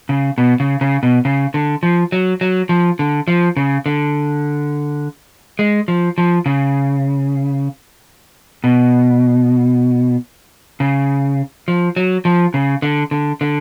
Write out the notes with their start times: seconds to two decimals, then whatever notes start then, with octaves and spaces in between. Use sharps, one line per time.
0.09 C#3
0.38 B2
0.60 C#3
0.81 C#3
1.03 B2
1.25 C#3
1.54 D3
1.83 F3
2.12 F#3
2.41 F#3
2.69 F3
2.99 D3
3.28 F3
3.57 C#3
3.86 D3
5.59 G#3
5.88 F3
6.18 F3
6.46 C#3
8.64 B2
10.80 C#3
11.68 F3
11.96 F#3
12.25 F3
12.54 C#3
12.82 D3
13.11 D3
13.41 D3